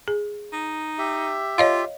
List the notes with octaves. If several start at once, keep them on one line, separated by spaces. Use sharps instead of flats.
G#4
D#4
G4 E5
F4 C#5 D#5 F5